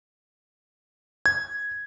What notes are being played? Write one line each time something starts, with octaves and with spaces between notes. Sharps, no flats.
G#6